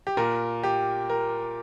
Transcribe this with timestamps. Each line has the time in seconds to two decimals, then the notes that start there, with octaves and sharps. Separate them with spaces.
0.07 G4
0.17 A#2 A#4
0.64 G4
1.10 A#4